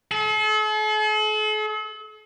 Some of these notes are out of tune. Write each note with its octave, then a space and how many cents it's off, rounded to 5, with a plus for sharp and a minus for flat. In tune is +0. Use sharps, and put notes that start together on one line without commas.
A4 -45